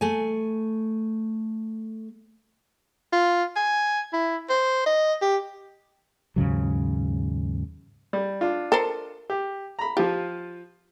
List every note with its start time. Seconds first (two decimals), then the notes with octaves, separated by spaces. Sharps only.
0.01 A3 G#5
3.13 F4
3.56 G#5
4.13 E4
4.50 C5
4.86 D#5
5.22 G4
6.36 D#2 G#2 C#3 F#3
8.13 G3
8.41 D4 F4
8.72 A4 A#4 C5
9.30 G4
9.79 A#5 B5
9.97 F3 F4 G4